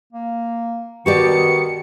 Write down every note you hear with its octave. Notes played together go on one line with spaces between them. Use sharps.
A#3
B2 D#3 F#4 G4 D5 C#7